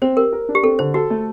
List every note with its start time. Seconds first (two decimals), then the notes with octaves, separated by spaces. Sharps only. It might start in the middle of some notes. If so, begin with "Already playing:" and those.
0.02 C4 C5
0.16 G4 A#4
0.33 A#4
0.49 D4
0.55 G4
0.63 C4 A4
0.79 D3 C5
0.94 F#4 A4
1.10 A3